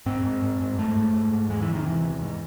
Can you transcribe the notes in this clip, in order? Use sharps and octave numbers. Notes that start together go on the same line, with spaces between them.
G#2 C4
G#2
G#2
G#2
G#2 A3
G#2
G#2
G#2
E2 G#3
E3
C3
D#3
E2 E3
E2
G#2